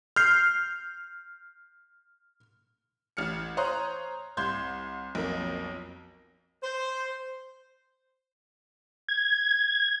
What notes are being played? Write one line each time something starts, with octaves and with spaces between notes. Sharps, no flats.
F6 G6 C7
A1 F6 C#7
C5 C#5 A#5 C6 D#6 F#6
C2 C6 G6 G#6
B1 F2 A#3
C5
G#6